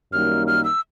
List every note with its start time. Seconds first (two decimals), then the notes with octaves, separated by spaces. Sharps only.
0.12 F#2 D#3 G3 A#3 D#4 F6
0.47 F6
0.64 E6